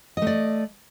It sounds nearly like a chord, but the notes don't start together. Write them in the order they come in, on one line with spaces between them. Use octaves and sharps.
D#5 A3 D5